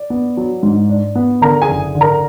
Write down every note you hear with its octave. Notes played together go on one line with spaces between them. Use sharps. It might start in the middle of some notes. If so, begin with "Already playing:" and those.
Already playing: D5
B3
F#3
G#2
D4
B3
D3 A#4 A#5
G#4 G#5
F#1
D3
A#4 A#5